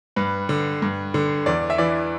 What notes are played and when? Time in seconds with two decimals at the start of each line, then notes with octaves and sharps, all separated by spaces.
0.16 G2 B4
0.49 D3
0.82 G2
1.14 D3
1.46 E2 D5
1.70 E5
1.78 E3 D5